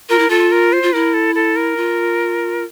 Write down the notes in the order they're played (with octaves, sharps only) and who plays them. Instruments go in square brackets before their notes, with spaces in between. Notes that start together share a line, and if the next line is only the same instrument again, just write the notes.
[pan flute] F4 [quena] A#4
[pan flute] E4
[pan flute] F4 [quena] A4
[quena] A#4
C5
[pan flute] F4
[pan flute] E4 [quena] A#4
[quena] A4
A4
A#4
[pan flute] F4